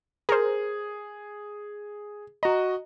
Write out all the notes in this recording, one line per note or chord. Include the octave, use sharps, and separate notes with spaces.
G#4 A#4 C5
F#4 D#5 A#5